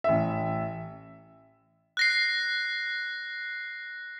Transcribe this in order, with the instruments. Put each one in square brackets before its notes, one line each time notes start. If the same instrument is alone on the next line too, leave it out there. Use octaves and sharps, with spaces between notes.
[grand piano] A1 E5
[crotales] F#6 A#6 C7